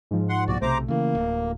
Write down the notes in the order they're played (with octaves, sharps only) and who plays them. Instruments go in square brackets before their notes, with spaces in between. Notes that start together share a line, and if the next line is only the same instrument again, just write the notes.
[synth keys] G#2 F3
[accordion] F#5 C6
[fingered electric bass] C2 A#2 [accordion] F#4 D5
[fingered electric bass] B1 C3 [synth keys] A3 [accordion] C5 A#5 D6
[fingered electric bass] C#3 E3 [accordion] A#3
[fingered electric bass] D1